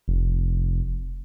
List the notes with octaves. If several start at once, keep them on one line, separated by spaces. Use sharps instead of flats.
F1